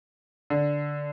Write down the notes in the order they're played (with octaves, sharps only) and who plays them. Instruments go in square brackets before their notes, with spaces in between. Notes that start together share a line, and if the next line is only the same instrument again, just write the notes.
[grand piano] D3